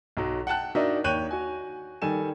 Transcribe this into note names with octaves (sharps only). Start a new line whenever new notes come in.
B1 F#3
F#5 G5 A5 F#6
D4 D#4 F#4 A#4 D#5 E5
D#2 C#5 G5 F#6 G6 D#7
F#4 G#5
D#3 G3 A4 G#5 E7